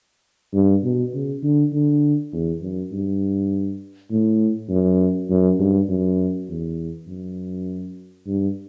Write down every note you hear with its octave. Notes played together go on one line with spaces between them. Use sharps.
G2
B2
C#3
D3
D3
E2
F#2
G2
A2
F#2
F#2
G2
F#2
E2
F#2
G2